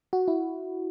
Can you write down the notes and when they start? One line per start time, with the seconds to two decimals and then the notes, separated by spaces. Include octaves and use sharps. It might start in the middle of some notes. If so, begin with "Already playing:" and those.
0.13 F#4
0.28 E4